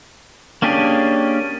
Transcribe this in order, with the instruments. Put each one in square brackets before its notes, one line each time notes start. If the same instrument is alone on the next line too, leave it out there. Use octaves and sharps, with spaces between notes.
[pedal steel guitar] A#3 C#4 D4 G4 G#4